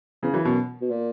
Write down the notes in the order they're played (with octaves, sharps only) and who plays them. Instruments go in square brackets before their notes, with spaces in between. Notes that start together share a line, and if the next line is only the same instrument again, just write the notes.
[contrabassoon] E2 [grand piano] C#3
[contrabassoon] F#2 [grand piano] E3
[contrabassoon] F#2 [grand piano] B2
[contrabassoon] B2
A#2